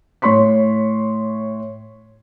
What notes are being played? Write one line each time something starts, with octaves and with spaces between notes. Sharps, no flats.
A2 C#5 C6 C#6 B6